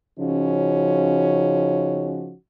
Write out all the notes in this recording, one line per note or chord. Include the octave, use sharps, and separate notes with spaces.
C#3 F3 C#4 D#4 F#4